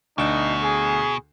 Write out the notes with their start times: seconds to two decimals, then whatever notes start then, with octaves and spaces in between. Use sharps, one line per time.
0.18 D2 B2 D4 D#4 E7
0.63 G#4